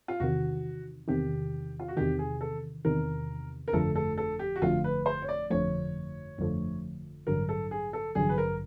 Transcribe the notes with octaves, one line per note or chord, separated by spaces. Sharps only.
F4
E2 C3 D#3 F#4
E2 C3 D#3 G4
F4
F#4
E2 C3 D#3 G4
G#4
A4
E2 C3 D#3 A#4
A#4
G1 F2 D3 F3 A3 A4
A4
A4
G4
F#4
G1 F2 D3 F3 A3 F4
B4
C5
C#5
D5
G1 F2 D3 F3 A3 C#5
G1 F2 D3 F3 A3
A1 G2 D3 F#3 A#4
A4
G#4
A4
A1 G2 D3 F#3 G#4
B4
A#4